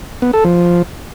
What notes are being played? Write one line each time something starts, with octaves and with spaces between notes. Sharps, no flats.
B3
A4
F3